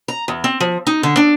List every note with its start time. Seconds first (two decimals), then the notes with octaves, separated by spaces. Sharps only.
0.08 A#5
0.28 E2
0.44 C4
0.60 F3
0.87 D#4
1.03 D3
1.17 D4